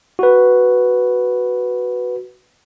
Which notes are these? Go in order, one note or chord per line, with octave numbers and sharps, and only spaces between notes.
F#4 B4